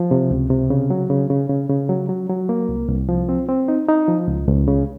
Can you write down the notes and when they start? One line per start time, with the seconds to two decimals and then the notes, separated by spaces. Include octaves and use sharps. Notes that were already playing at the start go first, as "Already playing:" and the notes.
Already playing: F3
0.11 C3
0.31 C#2
0.50 C3
0.70 C#3
0.90 F#3
1.10 C#3
1.30 C#3
1.50 C#3
1.70 C#3
1.89 F#3
2.09 F#3
2.29 F#3
2.49 A#3
2.69 C2
2.89 C2
3.09 F3
3.29 C4
3.48 C4
3.68 D#4
3.88 D#4
4.08 F3
4.28 C#2
4.48 C#2
4.68 C#3